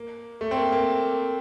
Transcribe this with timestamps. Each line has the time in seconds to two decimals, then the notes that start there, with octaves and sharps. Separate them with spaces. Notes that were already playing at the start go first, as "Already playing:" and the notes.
Already playing: A#3
0.41 A3
0.51 C4
0.57 A#3
0.72 A#3